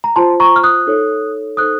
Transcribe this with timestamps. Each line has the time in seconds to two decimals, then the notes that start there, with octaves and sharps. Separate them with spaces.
0.04 A#5
0.16 F4 C5 A5 C6
0.40 A#5 C#6
0.56 F6
0.63 D#6 F#6
0.87 D#4 A4 C#5
1.57 D#4 A4 C5 D#6 F#6